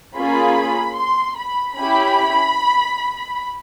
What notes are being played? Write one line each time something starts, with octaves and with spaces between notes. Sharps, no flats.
A#3 C#4 F4 G#4 B5
C6
B5
C#4 E4 G4 B5